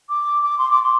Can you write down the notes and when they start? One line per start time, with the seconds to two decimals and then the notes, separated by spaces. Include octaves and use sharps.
0.09 D6
0.43 D6
0.58 C6
0.71 D6
0.83 C6